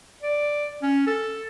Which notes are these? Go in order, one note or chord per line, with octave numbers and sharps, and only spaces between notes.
D5
C#4
A4